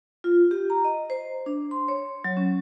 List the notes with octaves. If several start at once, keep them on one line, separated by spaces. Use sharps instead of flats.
F4
G4
A#5
D#5
C5
D4
C6
C#5
F#3
C#4